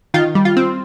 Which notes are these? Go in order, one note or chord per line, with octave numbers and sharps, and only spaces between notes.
D#3 F4
G3
F4
C4